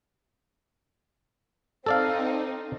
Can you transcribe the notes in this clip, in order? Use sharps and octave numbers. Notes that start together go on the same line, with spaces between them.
C4 D#4 A4 D5 F5